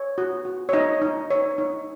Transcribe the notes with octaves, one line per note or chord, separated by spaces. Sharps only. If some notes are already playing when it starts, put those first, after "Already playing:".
Already playing: C#5
F#4
F#4
C#5
D#4 D#5
D#4
C#5
D#4